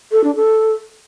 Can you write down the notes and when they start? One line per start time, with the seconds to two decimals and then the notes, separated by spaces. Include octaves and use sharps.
0.12 A4
0.24 D4
0.36 A4